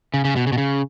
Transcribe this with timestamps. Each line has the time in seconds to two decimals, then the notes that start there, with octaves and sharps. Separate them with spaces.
0.14 C#3
0.25 C#3
0.36 B2
0.47 C#3
0.53 B2
0.58 C#3